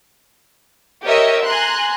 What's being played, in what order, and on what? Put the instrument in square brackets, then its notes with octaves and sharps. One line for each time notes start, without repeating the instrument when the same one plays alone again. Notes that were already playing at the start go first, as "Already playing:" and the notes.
[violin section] G4 A#4 C#5 D#5 E5
G#5 A#5 C6 F#6